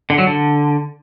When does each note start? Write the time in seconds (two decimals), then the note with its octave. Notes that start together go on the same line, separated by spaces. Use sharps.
0.10 D3
0.18 F#3
0.27 D3